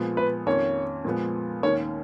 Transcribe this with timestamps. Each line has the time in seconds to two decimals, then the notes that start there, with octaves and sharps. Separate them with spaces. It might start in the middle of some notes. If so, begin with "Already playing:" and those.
Already playing: A#2 F3 G#3 B3
0.17 B4
0.47 F2 D#3 A#3 C#4 C#5
1.05 A#2 F3 G#3 B3
1.63 D#2 D#3 A#3 C#4 C#5